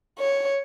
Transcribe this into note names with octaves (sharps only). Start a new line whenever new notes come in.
C#5